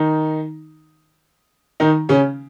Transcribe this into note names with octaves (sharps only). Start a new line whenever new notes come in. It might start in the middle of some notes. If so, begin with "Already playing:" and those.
Already playing: D#3 D#4
D#3 D#4
C#3 C#4